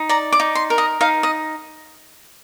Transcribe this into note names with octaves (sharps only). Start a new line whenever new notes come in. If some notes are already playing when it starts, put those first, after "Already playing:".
Already playing: D#4
D5 A#5
D6
D#4
C6
A#4
D#5
D#4 F5
D#5